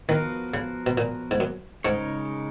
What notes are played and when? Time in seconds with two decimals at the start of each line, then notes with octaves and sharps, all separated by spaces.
0.09 D#3 F3 B3 F#4 A#4 F5
0.54 C#3
0.86 B2
0.98 A#2
1.31 G#2
1.40 F#2
1.84 G#2 C#3 G#3 D#4 A#4 C#5